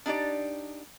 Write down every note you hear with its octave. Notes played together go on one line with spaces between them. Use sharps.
D4 D#4 G4 D5